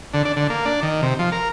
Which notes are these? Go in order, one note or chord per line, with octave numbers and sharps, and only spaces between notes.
D3
D4
D3
A#3
D4
D#3
C3
F3
A#4